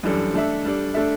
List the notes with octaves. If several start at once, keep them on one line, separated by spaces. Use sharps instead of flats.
F#2 E3 G3 D4 A4
A3 D4 A4 E5
G3 D4 A4
A3 D4 A4 E5